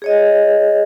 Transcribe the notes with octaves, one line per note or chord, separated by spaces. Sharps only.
G#4 C#5 D#5